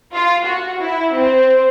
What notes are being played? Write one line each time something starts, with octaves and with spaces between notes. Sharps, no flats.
F4
F#4
E4
C4